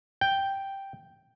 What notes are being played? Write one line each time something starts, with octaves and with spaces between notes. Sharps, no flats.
G5